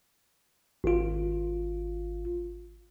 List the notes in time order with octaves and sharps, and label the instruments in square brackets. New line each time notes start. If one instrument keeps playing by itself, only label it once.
[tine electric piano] G#1 F4